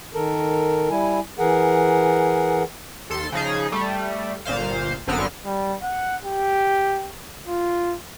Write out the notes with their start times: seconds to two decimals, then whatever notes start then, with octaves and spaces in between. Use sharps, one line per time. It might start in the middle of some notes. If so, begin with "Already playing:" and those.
0.14 D#3 A4 A#4
0.90 G3 E4 G#5
1.39 E3 G#4 A#4 F#5
3.10 D#2 A4 C6
3.32 C#3 F3 D#4 G#4
3.72 G3 A3
4.45 G1 A#2 C5 F5
5.07 G1 F#2 D3 B3 C4 F6
5.45 G3
5.83 F#5
6.23 G4
7.48 F4